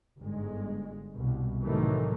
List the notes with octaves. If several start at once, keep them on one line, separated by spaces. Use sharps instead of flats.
G1 G#2 G#3
C2 B2
A2 C3 D#3 E3 F#3 A3